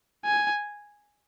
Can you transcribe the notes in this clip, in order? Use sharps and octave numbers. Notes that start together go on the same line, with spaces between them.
G#5